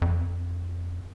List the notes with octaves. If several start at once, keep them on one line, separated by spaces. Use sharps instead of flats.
F2